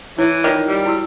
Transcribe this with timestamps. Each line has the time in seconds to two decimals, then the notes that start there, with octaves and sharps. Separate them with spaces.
0.18 E3 E4 C#5
0.44 D#3 F4 C#5 D5
0.67 G3
0.86 E4 F#4 E6